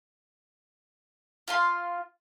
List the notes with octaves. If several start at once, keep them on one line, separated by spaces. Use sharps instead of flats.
F4 F5 C6